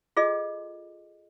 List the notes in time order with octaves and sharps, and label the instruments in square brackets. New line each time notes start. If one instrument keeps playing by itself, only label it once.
[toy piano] F4 G#4 A4 D#5